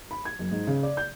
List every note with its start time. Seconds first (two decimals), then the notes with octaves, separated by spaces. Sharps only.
0.11 B5
0.25 G#6
0.39 F#1
0.51 G#2
0.67 C#3
0.83 D5
0.97 G6